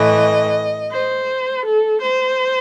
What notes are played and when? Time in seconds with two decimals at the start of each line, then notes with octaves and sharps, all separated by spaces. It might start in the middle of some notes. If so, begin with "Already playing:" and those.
Already playing: A2 E3 A3 D#5
0.92 C5
1.65 A4
2.02 C5